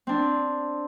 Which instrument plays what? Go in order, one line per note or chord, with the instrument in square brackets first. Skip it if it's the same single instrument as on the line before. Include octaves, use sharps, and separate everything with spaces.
[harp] C4 D4